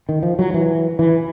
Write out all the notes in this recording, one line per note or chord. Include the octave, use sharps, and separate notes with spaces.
D#3
F3
F#3
E3
E3